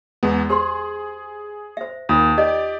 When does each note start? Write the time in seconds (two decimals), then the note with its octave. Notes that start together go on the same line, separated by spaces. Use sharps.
0.23 E2 G#3 B3
0.49 G4 G#4 C5 C6
1.77 C5 E5
2.09 D#2 D#4 F4 D#6
2.38 G4 D5 D#5